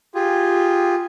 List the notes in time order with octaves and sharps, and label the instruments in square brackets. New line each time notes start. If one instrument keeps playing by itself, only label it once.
[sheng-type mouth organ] F4 G4 G#4